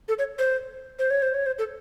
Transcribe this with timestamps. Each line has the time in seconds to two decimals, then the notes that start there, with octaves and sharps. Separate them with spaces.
0.09 A4
0.19 C#5
0.39 C5
0.99 C5
1.10 C#5
1.22 C5
1.34 C#5
1.46 C5
1.59 A4